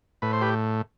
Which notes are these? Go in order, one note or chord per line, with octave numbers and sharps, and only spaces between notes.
A2 B4
C5
G4 B4